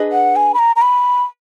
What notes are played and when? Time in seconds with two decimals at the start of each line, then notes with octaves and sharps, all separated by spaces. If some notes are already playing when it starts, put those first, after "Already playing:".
Already playing: D4 G#4 B4 D#5
0.12 F#5
0.36 G#5
0.54 B5
0.59 A#5
0.76 A#5
0.82 B5